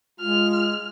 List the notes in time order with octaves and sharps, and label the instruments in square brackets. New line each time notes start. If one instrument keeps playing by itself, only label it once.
[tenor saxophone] G#3 [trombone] F4 [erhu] F6